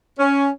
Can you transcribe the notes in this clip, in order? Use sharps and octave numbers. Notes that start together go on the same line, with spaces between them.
C#4